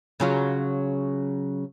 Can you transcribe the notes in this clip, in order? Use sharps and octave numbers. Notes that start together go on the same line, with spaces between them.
C#3 F#3 F4